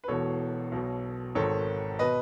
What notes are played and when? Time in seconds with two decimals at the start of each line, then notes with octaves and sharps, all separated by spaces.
0.04 B4
0.08 E1 E2 B2 A4 C#5
0.72 B1 B2
1.35 G#1 G#2 D#3 A4 C#5
1.99 B2 B4 D#5